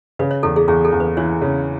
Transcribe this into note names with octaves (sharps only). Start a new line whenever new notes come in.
C#3 B4
C#5
E2 A4
G#4
E2 G#4
A4
E2
B4
E3 C#5
C#3